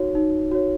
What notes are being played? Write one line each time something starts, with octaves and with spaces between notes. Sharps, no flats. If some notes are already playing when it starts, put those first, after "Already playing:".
Already playing: D#4 F#4 C#5
D#4
F#4 C#5